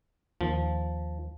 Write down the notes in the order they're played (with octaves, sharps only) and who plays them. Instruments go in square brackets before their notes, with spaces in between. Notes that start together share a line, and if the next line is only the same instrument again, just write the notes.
[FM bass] D#2 [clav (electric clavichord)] F3